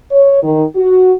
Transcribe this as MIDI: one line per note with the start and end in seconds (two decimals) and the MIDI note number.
0.11 0.42 73
0.43 0.64 51
0.76 1.14 66